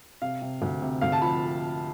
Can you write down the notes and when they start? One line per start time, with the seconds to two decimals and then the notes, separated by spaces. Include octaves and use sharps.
0.22 C3 F5
0.42 C3
0.62 D2
0.82 C3
1.01 D2 F5
1.12 A5
1.22 F3 B5